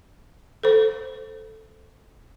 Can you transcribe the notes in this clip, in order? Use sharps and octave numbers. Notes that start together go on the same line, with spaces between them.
A4 C5